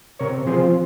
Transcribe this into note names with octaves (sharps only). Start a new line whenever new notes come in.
C3 A#4 C#5
F3 C4 G#4 C5